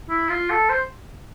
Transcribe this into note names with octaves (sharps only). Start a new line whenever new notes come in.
E4
F4
A4
C5